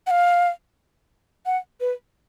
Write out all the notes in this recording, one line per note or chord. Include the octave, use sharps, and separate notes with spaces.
F#5
F5
F#5
B4